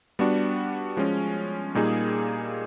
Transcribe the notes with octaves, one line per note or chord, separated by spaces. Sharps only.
G3 B3 D4 F#4
F3 G#3 C#4
A#2 G3 A#3 D#4 G#4